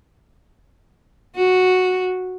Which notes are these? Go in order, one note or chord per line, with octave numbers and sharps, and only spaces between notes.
F#4